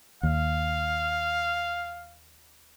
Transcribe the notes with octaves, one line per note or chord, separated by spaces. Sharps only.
D#2 F5